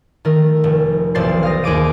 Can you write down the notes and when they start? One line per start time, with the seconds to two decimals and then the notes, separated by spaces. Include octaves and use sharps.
0.25 D#3 A3 A#4
0.64 F1
1.15 E1 B1 C5 D5 A6 C7
1.43 F5 D#6 A#6
1.64 D#2 G#4 D6 D#7